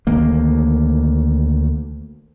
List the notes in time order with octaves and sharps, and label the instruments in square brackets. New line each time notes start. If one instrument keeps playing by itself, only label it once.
[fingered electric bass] D2 D#3 A#3